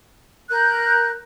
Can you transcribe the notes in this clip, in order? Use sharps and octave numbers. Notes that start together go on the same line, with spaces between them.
A#4 F#6 G6